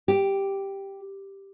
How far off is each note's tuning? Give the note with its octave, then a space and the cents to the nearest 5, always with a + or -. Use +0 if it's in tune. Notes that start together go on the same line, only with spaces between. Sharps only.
G4 +0 G5 +25